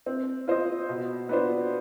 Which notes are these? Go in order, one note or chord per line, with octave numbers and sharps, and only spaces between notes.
C4
F4 C5 D#5
B2
B3 D4 F4 C5